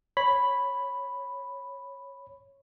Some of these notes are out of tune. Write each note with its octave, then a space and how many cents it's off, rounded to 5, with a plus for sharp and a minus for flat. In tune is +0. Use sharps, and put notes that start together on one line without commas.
C#5 -10 B5 +0